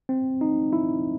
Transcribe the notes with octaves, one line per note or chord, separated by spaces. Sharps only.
C4
D#4
E4